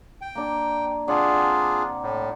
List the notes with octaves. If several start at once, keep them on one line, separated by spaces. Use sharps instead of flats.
G5
A#3 D4
C3 D4 F4 G#4 D5 F#5
A2